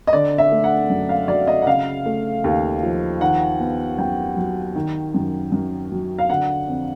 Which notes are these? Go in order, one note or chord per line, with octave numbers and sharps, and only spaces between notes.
D#5
D3 D5
E5
A3
F#5
F#2
F5
F#3 D5
D#5
F#5
C#3 F5
A3
D#2
F3
D#3 F#5
B3
F#2 G5
F#3
D#3
F#2
F#2
F#3
F5
D3 F#5
F2